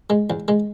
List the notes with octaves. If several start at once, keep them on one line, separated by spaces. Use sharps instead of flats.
G#3
E2
G#3